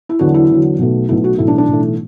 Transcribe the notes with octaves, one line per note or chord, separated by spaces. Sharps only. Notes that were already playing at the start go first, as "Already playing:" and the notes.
E4
E2 D3 F#3 F#4
E4
E2 D3 F#3
B1 B2 A3
B1 B2 A3 E4
F#4
B1 A2 E3 A3 E4
D4
D4
B1 A2 E3 A3